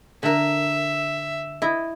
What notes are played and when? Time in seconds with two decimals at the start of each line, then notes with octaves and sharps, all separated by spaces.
0.23 D3 A#4 E5
1.62 E4 D#5